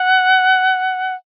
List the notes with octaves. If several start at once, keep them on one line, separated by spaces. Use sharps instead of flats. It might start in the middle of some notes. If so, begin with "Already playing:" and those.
Already playing: F#5